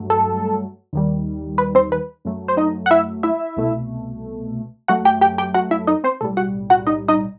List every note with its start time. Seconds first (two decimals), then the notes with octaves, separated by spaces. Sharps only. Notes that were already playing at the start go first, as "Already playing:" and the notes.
Already playing: G2 F#3 A3
0.10 A4
0.93 D#2 D#3 G3
1.58 B4
1.75 C4 C5
1.92 B4
2.25 F#2 F#3 A3
2.48 C5
2.57 D#4 D#5
2.86 F#5
2.91 E4 E5
3.23 E4 E5
3.57 C2 B2 A3
4.88 F#2 F#3 A3 F#4 F#5
5.05 G4 G5
5.21 G4 G5
5.38 G4 G5
5.54 F#4 F#5
5.71 E4 E5
5.87 D#4 D#5
6.04 C4 C5
6.21 B1 A2 G3 A4
6.37 F#4 F#5
6.70 F#4 F#5
6.87 D#4 D#5
7.08 D#4 D#5